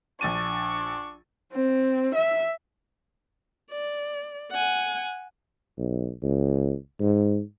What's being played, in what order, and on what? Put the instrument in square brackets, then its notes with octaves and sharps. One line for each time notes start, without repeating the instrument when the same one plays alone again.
[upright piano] A#1 A6 D#7 [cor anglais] D4 [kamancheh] C#6
[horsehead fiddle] C4
E5
[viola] D5
F#5 G#5
[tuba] B1
C#2
G#2